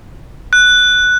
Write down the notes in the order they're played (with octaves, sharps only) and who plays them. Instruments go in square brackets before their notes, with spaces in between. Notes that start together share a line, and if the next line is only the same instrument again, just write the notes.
[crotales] F#6